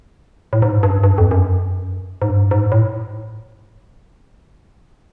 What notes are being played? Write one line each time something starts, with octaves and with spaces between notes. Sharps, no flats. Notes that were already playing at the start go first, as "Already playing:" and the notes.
A2
G#2
G2
G2
F2
F#2
G#2
G2
G#2
A2